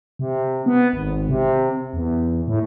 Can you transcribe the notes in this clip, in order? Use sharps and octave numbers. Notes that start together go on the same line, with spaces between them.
C3
B3
G#1
C3
E2
A2